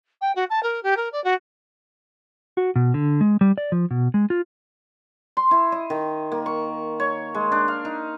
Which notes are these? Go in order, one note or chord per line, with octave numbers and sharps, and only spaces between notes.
G5
F#4
A5
A#4
G4
A#4
D5
F#4
F#4
B2
D3
G#3
G3
D5
F3
B2
G#3
F4
C6
E4
D#5
D#3
A#3
C#6
C#5
G#3
D4
F5
D#4